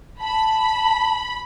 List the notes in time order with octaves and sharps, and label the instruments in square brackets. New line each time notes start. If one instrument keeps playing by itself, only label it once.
[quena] A5 [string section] B5